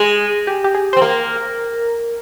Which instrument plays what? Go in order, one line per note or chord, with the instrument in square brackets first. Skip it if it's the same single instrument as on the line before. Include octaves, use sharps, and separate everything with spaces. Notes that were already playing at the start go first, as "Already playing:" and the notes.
Already playing: [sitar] G#3 [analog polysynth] G#4
[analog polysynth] G4
G4
G#4
[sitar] C4 [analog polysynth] C5
[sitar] A#3 [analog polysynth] A#4